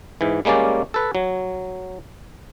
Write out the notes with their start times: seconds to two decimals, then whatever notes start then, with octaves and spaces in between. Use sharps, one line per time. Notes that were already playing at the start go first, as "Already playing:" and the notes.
0.21 G#2 E3
0.45 G3 G#3 A#3 C#4 D5
0.94 A4 B4
1.15 F#3